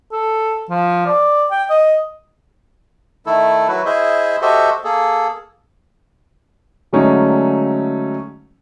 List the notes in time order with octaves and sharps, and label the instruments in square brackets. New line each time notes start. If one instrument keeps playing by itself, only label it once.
[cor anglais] A4
F3
D5
G5
D#5
[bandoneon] D#3 A3 E4 A4
F#3 E4 F#4 B4
E4 G#4 C5 D#5 E5
F#4 G4 A4 C5 D#5 E5
A#3 G#4 A4
[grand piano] D3 F#3 G#3 A3 C#4 D#4